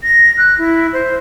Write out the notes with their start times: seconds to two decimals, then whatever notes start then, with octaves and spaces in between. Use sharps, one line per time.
0.04 A#6
0.38 F#6
0.58 E4
0.93 C5